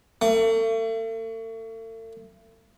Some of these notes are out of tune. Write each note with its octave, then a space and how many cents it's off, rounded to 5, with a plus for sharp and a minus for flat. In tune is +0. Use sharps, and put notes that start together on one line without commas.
A3 +40